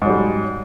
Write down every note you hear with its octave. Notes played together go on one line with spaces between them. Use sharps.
G#2 F#3 G3